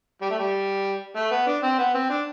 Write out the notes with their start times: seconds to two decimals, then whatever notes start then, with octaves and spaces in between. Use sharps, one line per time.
0.22 G3
0.30 A3
0.39 G3
1.16 A3
1.31 B3
1.47 D4
1.63 C4
1.79 B3
1.94 C4
2.10 D4